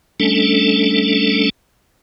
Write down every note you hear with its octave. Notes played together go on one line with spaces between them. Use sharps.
G3 A3 C#4 D4 A4